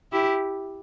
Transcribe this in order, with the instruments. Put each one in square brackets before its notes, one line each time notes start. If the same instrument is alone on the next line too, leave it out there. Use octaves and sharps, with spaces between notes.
[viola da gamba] E4 G4